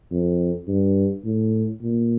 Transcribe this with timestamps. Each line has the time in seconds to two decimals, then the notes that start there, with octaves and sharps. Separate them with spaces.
0.12 F2
0.68 G2
1.25 A2
1.82 A#2